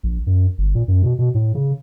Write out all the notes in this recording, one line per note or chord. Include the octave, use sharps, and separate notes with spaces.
A#1
F#2
G1
A#2
F#2
B2
B2
A2
C#3